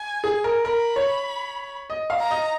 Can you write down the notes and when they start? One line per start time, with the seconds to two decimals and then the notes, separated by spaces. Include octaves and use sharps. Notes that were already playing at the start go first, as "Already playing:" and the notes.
Already playing: G#5
0.24 G#4
0.44 A#4
0.65 A#4 B5
0.96 C#5
1.90 D#5
2.10 F5
2.21 A#5
2.31 D#5